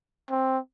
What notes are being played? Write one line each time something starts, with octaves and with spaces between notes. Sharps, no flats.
C4